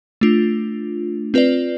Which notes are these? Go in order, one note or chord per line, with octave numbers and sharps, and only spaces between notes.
A3 D4 F4
C4 F4 B4 D5